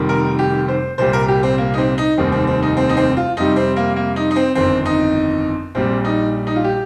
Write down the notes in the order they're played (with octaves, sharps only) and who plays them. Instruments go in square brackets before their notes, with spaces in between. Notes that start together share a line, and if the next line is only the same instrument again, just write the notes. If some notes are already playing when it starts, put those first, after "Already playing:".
Already playing: [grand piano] F1 F2 D#3 G3
A#4
G4
C5
C2 A#2 G3 C5
A#4
G4
C4
A#3
D#4
C4
D#4
F1 D#2 D#3 G3 C4
C4
C4
D#4
C4
D#4
C4
F4
F2 C3 G3 D#4
C4
A#3
A#3
D#4
D#4
C4
G1 F2 D#3 C4
D#4
A#1 A#2 G3 C4
D#4
D#4
F4
G4